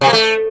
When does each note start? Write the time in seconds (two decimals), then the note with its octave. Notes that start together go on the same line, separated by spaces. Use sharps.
0.01 C3
0.07 A#3
0.13 A3